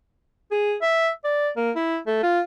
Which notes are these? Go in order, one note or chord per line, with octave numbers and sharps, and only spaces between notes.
G#4
E5
D5
A#3
E4
A3
F4